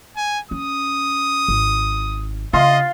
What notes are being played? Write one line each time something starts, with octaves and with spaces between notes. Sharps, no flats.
G#5
C#4 D#6
G#1
C#3 F4 D#5 C6